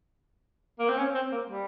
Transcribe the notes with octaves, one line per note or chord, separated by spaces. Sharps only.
A#3
C4
C#4
C4
A#3
G3